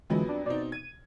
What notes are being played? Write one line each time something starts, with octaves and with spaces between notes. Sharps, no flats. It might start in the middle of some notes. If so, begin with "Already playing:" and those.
F2 D3 E3 F#3 G#3 B3
D4
B2 C4 D#4 D5
G#6 D#7